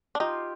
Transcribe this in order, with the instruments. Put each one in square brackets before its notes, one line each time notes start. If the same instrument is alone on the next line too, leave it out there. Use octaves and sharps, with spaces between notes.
[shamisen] D4
[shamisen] D#4 [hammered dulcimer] F4 G4